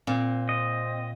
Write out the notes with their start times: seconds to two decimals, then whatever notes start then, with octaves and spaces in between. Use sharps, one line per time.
0.07 A#2 C4
0.49 D#5